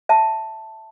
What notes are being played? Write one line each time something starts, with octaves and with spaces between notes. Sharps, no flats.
E5 A5